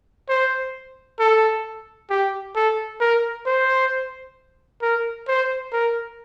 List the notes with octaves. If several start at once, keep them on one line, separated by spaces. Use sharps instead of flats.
C5
A4
G4
A4
A#4
C5
A#4
C5
A#4